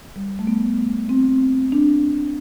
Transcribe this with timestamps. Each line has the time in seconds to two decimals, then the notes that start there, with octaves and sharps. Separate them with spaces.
0.16 G3
0.39 A3
0.47 B3
1.09 C4
1.72 D4